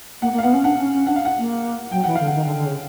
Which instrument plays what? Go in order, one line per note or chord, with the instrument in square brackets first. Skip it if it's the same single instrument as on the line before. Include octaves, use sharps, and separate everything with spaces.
[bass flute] A#3 [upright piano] F#5
[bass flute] A#3
[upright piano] F5
[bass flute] B3 [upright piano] F#5
[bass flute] C#4
[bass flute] D4 [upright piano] F#5
[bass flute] C#4
C#4
[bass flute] D4 [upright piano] F#5
[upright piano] F5
F#5
[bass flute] A#3
[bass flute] F#3 [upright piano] G5
[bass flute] E3 [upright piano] F#5
[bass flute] D3 [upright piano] F5
[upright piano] F#5
[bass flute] D#3
D3
D3
C#3